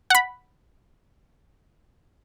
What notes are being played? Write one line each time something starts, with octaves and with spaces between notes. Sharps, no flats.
F#5 B5